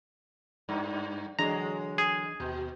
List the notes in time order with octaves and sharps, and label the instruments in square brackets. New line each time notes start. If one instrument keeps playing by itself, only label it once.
[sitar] G2
[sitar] D3 F#3 G#3 [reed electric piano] E3 D4 D#5 [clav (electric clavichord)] A#5
[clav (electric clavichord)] G#4
[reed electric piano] D#2 G6 [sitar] B2